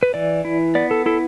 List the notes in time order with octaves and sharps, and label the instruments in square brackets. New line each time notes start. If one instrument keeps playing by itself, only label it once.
[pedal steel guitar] B4
E3 D5
E4
B3 D5
A4
E4 A4